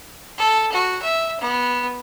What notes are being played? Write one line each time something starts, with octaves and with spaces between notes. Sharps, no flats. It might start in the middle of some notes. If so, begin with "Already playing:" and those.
A4
F#4
E5
B3